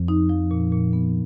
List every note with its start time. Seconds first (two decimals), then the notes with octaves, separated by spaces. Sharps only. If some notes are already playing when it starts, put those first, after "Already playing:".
Already playing: F2
0.08 D#4
0.29 F3
0.51 A#2
0.72 A#2
0.93 B3